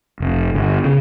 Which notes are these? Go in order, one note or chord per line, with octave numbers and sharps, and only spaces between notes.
F1
G1
C#3